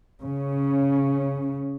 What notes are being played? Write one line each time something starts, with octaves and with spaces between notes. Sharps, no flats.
C#3 C#4